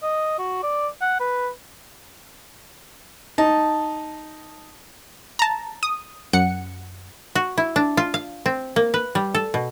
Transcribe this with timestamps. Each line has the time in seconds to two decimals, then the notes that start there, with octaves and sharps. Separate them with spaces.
0.03 D#5
0.39 F#4
0.63 D5
1.02 F#5
1.20 B4
3.38 D#4 A5
5.39 A5 A#5
5.83 D#6
6.33 F#2 F#5 C#7
7.35 F#4
7.58 E4
7.76 D4
7.97 F4
8.14 F5
8.46 C4
8.76 A#3
8.94 B4
9.15 G3
9.34 A4
9.54 B2